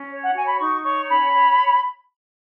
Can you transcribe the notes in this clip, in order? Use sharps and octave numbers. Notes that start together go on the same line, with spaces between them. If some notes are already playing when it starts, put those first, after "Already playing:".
Already playing: C#4
C#5
F#5
F#4 G#5
B5
D#4 C#6
C#5 C#6
C#4 B5
C#5